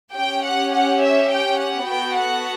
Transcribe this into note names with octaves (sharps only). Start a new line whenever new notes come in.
C#4 G4 G5
F#5
F#5
E5
G5
F#5
B3 F#4 A4 G5
F#5